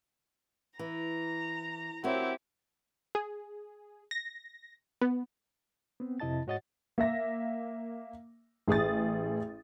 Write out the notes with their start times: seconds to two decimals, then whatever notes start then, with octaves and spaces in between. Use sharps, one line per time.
0.79 E3 A#5
2.04 C4 E4 F#4 G4 A#4 C#5
3.15 G#4
4.11 A#6
5.01 B3
6.00 B3 C4
6.20 F2 C3 E4 D#5 A5 A6
6.47 G#2 F#4 C#5 D#5 F#5 A6
6.98 A#3 E5 A#6
8.68 A1 G#4 D#6 A6